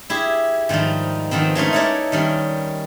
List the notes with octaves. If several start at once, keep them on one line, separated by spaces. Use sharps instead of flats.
E4 G4 G#4
G#2 D#3 F3 G3 D#4
D#3 F3 B3 C4
G#3 A3 C#4 D#4
D#4 E4 A4 A#4 C#5 D5
D#3 G3 C#4